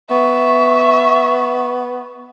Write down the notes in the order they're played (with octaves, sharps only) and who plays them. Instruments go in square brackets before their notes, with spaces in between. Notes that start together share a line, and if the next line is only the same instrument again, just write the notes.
[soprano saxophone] B3 [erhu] E5 [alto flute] C#6